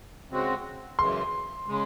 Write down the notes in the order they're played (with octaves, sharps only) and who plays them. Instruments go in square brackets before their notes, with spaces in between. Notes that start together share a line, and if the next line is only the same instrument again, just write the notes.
[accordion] C#3 G#3 C4 F#4
[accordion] F#2 C#3 E3 G#3 [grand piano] C6
[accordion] C#3 G#3